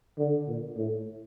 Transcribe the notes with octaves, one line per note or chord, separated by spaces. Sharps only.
D3
A#2
A2